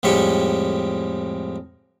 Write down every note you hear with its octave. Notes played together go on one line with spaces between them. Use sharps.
F2 A2 G3 G#3 G4 C#6